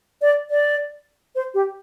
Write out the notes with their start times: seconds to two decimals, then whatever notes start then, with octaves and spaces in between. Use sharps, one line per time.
0.22 D5
0.50 D5
1.35 C5
1.54 G4